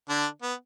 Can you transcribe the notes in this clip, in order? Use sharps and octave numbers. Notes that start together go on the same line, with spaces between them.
D3 D4
B3